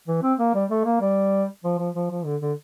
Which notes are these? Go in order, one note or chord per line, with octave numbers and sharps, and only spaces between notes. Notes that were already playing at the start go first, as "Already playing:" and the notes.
E3
C4
A#3
G3
A3
A#3
G3
F3
F3
F3
F3
D3
D3